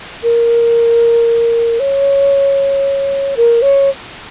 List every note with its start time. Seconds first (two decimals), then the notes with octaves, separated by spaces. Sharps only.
0.23 A#4
1.80 C#5
3.37 A#4
3.62 C#5